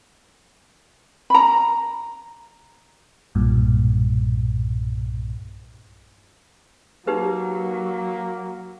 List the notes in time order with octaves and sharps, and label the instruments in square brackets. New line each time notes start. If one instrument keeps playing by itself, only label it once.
[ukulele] A#5 B5
[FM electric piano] B1 G2 A#2
[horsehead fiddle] F#3 [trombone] A#3 [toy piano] D#4 G4 B4